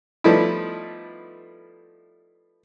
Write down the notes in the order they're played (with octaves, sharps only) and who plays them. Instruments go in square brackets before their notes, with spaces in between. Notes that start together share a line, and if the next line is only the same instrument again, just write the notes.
[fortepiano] F3 G3 A3 B3 D#4 E4